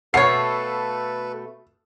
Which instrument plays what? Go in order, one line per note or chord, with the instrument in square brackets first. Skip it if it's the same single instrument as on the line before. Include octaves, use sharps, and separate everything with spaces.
[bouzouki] B2 A3 F5 [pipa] F#4 C#5 [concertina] A4 B4 [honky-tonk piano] C7